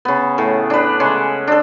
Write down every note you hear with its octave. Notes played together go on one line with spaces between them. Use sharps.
C#3 B3
A2
D4 B4
C#3 G#3
D4 A4